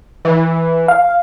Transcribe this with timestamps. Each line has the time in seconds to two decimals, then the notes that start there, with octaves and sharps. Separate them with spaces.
0.25 E3
0.88 F5